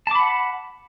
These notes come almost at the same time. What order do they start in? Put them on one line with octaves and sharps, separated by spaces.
A5 D6 B5 F#5